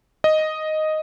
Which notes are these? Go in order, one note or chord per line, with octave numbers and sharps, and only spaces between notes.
D#5